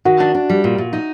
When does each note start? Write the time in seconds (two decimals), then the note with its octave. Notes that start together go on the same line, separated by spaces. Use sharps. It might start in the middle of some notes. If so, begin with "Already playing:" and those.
0.05 D#3 F#4
0.20 D4
0.35 D4
0.50 G3
0.64 A#2
0.78 A#2
0.93 D#4